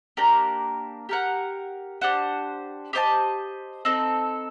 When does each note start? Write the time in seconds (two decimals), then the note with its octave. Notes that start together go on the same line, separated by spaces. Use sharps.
0.17 A#3 D4 G4 A#4
1.09 G4 A#4 F#5
2.01 D4 G4 C5 F#5
2.93 G4 C5 D#5 A5
3.85 C4 D#4 A4